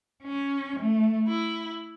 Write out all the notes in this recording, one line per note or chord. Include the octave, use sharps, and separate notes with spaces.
C#4
A3
E4